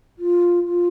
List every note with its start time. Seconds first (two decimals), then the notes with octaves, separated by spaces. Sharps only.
0.19 F4
0.65 F4